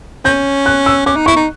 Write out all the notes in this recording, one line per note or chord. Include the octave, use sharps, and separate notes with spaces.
C#4 G6
F#6
E6
C#4 D6
D#4
E4 C#6
D#4